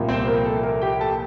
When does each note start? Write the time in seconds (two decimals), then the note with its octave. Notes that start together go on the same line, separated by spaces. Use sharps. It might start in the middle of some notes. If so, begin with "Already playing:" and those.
Already playing: C2 A#2 F3 A#3
0.09 C4 C5
0.28 A#4
0.46 A4
0.63 A#4
0.82 G4 G5
1.00 A4 A5